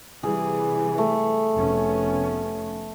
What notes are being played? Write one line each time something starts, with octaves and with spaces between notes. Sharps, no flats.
C3 E3 G3 G#4
A3
F1 B3 C#4